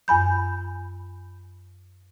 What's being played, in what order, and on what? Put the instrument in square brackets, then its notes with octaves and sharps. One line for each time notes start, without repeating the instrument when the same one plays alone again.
[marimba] F#2 G#5 B5 G6